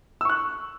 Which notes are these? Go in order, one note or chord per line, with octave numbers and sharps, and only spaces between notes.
C#6 E6 F#6